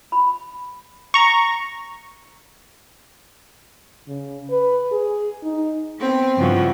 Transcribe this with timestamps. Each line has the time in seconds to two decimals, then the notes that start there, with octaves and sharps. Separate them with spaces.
0.12 B5
1.14 A#5 C#6
4.07 C#3
4.50 B4
4.92 G#4
5.43 D#4
5.99 B3 C4
6.37 G2 C#3 E3 F3 F#4